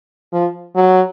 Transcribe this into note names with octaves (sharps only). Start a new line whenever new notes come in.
F3
F#3